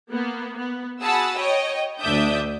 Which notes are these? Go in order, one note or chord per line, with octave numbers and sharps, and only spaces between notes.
A#3 B3
B3
F#4 G#4 F#5 A5 B5 E6
C#5 D#5 G5
D2 D4 D5 E5 D#6 G6